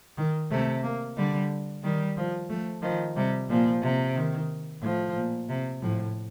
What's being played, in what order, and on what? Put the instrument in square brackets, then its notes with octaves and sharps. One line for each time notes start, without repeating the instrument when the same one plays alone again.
[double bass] D#3
[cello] C3 [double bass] A3
[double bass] A#3
[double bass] D3 [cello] G3
[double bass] D#3 [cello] G3
[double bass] F3
[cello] F3 [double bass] A3
[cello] D#3 [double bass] F3
[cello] C3 [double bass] G3
[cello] A#2 [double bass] F3
[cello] C3
[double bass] D#3
[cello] A2 [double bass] F3
[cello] A#2
C3
[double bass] A2 [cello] F3